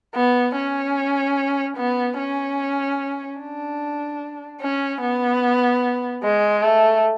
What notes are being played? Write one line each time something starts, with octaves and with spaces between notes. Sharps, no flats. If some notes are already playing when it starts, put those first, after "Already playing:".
B3
C#4
B3
C#4
D4
C#4
B3
G#3
A3